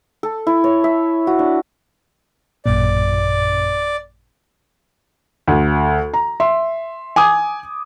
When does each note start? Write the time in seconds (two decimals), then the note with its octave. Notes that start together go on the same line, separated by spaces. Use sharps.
0.23 A4
0.47 E4
0.64 C#5
0.84 E5
1.27 F#4
1.39 D4
2.66 A1 F#2 A#2 D5
5.47 D2
6.14 A#5
6.40 E5 C6
7.16 G#5 D6 D#6 G#6